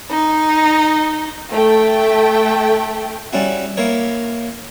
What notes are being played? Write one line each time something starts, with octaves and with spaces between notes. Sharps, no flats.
D#4
A3 G5
G3 C#4 E4 F#4
A#3 E4 A#4 C#5